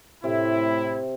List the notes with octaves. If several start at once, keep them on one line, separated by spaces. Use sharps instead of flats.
A2 C3 E4